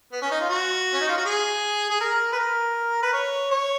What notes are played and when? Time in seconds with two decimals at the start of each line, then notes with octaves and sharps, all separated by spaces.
0.12 B3
0.22 C#4
0.31 D#4
0.41 F4
0.50 F#4
0.93 C#4
1.01 D#4
1.09 F4
1.18 F#4
1.25 G#4
1.90 G#4
2.01 A#4
2.33 B4
2.39 A#4
3.03 B4
3.13 C#5
3.51 C#5